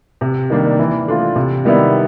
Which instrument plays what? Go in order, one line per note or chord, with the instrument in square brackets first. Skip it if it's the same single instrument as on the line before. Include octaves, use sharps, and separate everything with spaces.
[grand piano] C3
D#3 G3 A#3 D4
E3
A3 D4 F4
C3
D#3 G3 B3 E4